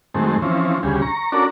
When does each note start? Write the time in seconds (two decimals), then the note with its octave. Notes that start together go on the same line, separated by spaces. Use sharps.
0.14 F#2 D#3 G#3 A3 C4
0.42 E3 F3 C4 C#4
0.83 D2 C#3 G3 G#4
1.02 A#5 C#6
1.32 C#4 D4 F#4 A4 A#4 D5